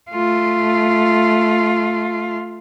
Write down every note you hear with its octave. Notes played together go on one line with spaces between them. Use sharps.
A3 F4